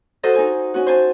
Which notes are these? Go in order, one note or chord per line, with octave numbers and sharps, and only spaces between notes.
F#4 A4 C5 D#5
D#4 G#5
C#4 F#4
C5 G#5 A5